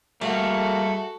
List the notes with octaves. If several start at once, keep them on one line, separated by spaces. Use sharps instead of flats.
G3 A3 A#3 F#4 G#4 A4